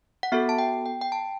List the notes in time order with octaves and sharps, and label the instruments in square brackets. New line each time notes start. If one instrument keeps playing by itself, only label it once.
[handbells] F#5
B3 F#4 A4 E5
A5
G5
G5
G5
A5